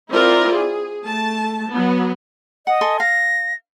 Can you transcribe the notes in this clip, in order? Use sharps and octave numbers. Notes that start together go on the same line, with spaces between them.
C4 E4 F4 A#4 D5
G#4
A3 A5
F#3 B3
D#5 F#5
A4 G#5 C6
F5 A#6